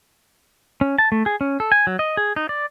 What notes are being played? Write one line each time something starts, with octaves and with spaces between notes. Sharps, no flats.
C#4
A5
A3
G#4
C#4
A4
G#5
F#3
D#5
G#4
D#4
D5